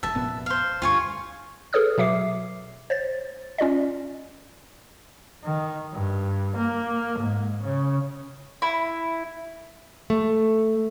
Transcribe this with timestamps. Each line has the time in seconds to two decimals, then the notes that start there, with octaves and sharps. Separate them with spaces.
0.03 D#1 E5 A5
0.15 F1 A#2 B3
0.46 C5 F5
0.82 D2 G2 F4 G#5 C#6
1.73 G#4 A4 B4 C#5 D#6 F6
1.98 B2 F#3 E5 D6 C7
2.90 C5 C#5 A6
3.58 C#4 F4 D5 D#5
5.44 D#3
5.93 G2
6.56 A#3
7.18 G#2
7.62 C#3
8.62 E4
10.10 A3